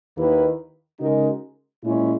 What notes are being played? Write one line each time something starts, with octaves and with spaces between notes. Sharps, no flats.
D#2 D#3 A#3 E4 B4
C#3 G#3 D#4 F#4 A#4
A#2 G#3 C#4 E4